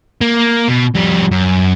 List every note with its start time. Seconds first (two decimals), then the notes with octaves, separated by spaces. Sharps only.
0.21 A#3
0.68 B2
0.94 F2 G3
1.31 F#2